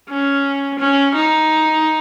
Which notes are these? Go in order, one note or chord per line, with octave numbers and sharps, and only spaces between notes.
C#4
C#4
D#4